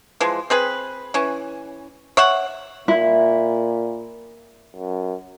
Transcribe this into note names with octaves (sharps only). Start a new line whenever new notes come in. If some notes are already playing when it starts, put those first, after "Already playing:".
E3 F3 G#3
C4 G#4 B4
E3 C#4
C#5 E5 F#5
A#2 E4
F#2